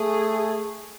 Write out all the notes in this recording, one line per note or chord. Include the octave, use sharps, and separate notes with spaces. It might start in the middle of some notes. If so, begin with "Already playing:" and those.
Already playing: A3 G#4